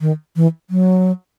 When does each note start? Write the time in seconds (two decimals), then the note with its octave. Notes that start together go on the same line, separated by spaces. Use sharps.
0.01 D#3
0.36 E3
0.70 F#3